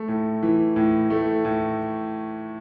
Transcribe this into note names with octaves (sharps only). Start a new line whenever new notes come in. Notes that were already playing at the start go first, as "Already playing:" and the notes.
Already playing: A3
A2
E3
A2
A3
A2